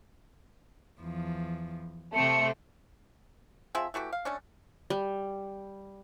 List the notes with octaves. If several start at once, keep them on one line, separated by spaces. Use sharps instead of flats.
E2 F3
C3 A3 C4 C#7
F3 C4 G#4 E5
E3 A3 F#4 G4
F5
A3 C#4 D4
G3